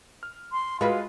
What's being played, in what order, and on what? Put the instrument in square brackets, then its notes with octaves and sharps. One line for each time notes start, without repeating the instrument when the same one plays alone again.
[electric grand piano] F6
[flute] C6
[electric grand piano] G#3 F4 [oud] F#4 B4 [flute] F5